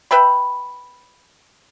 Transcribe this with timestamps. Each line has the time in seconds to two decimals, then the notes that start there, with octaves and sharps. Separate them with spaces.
0.11 B4 E5 G5 B5